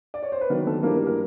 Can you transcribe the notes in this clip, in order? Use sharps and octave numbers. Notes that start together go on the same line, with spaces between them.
D5
C#5
C5
B4
D#3 F#3 A#3 B3 A#4
A3 A4
G2 E3 G3 A#3 A#4
A#4